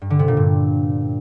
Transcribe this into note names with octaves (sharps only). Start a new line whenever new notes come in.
G2
D3
C3
A#2
G2